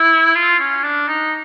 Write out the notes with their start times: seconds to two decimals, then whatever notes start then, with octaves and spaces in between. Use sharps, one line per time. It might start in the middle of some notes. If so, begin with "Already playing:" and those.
Already playing: E4
0.35 F4
0.59 C#4
0.83 D4
1.08 D#4